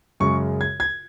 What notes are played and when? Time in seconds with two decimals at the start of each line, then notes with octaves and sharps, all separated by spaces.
0.20 F#2 C#3 G#3 C#6
0.61 G#6
0.80 G#6